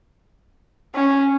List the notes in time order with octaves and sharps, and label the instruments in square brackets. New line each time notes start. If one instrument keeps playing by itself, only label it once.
[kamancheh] C#4